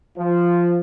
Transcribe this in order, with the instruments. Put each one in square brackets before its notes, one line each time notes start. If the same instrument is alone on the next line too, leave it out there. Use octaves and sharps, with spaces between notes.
[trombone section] F3